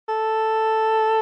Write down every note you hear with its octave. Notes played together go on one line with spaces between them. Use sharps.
A4